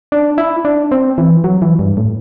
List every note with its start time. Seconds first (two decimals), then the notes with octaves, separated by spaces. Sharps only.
0.12 D4
0.38 E4
0.65 D4
0.92 C4
1.18 E3
1.44 F#3
1.62 E3
1.79 G2
1.97 A2